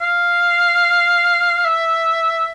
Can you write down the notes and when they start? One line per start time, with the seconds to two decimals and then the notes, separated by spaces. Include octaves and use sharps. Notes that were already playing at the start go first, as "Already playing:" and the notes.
0.01 F5
1.65 E5